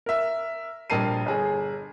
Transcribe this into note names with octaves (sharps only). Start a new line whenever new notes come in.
A#4 E5
A#1 G3 A#4 A5 C7 D#7
G1 G#4